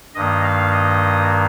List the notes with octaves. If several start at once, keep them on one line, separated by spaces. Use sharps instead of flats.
G2 D#3 A#3 D#5
F5
D#5